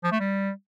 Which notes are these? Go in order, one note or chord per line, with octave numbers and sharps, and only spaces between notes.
F3
A3
G3